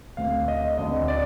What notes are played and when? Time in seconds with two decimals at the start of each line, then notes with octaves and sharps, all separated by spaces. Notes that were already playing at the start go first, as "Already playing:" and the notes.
0.17 D2 D3 A3 C4 F5
0.48 D#5
0.78 D2 D3 A3 C4 D#5
1.08 D5